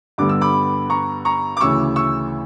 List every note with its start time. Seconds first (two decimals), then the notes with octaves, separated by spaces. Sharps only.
0.18 G2 D3 G3 B3 D6
0.29 E6
0.41 B5 D6
0.90 A#5 C#6
1.25 A#5 C#6
1.57 D6
1.60 D2 C#3 E3 C#6 E6
1.96 C#6 E6